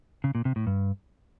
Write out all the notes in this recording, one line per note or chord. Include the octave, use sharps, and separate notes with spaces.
C#3
A#2
C3
A2
G2